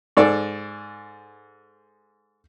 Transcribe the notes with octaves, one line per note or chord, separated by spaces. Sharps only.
G#2 A4 D5